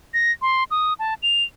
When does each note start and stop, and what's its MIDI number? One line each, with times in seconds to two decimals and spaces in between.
0.14 0.32 94
0.42 0.64 84
0.71 0.94 87
0.99 1.14 81
1.23 1.43 101